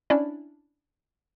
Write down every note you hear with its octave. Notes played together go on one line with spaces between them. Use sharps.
C#4 D4 E4 D5